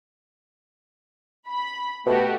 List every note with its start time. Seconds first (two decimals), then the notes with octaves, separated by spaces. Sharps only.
1.48 B5
2.06 B2 A3 F#4 G4